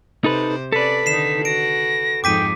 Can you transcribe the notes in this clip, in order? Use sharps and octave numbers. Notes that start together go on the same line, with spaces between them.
C3 D#4 A4 B4 C5
C#4 A4 B4 D5 B6
D3 D#3 D#4 C7 E7
F#4 A#6 D7
F2 G#2 D#4 G5 D6 B6 D#7